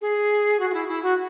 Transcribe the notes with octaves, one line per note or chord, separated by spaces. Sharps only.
G#4
F#4
F#4
E4
E4
F#4